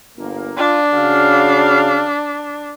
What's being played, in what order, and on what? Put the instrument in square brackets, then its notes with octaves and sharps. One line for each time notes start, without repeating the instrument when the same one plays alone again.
[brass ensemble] G1 A#3
[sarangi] D4 [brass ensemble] F4
[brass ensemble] C#3 F#4 F5